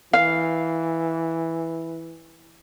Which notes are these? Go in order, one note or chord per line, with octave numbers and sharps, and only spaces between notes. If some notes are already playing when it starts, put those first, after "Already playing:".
E3 F5